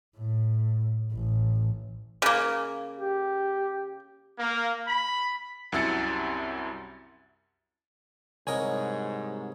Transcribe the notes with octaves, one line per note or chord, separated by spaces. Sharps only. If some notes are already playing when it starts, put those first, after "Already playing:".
A2
A1
C#3 A#3
G4
A#3
B5
C2 F#2 E4 E6 A6 C#7
C2 G#2 A#4 C#5 D#5 G#5